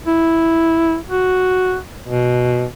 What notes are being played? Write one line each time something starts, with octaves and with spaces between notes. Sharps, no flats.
E4
F#4
B2